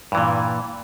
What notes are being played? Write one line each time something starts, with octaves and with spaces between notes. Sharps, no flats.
G2 A#2 E3